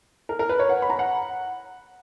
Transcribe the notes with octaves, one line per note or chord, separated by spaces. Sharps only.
A#4
A#4
B4
C#5
F#5
B5
A#5
F#5